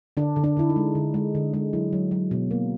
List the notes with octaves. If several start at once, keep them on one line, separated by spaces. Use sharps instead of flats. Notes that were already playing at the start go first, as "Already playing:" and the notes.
D3 D4
D3
D4
D3 E4
D#4
G#3
D3
G#3
D3
G#3
F#3 E4
F#3
F#3
B2
A#3